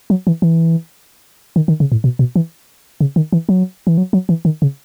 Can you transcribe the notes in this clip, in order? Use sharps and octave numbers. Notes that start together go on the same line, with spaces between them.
F#3
E3
E3
D#3
D#3
C#3
A2
B2
B2
E3
C#3
D#3
E3
F#3
E3
F#3
F#3
E3
D#3
C#3